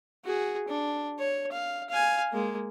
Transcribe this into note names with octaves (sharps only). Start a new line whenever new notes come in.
F#4 G#4
D4
C#5
F5
F5 G#5
G#3 A#3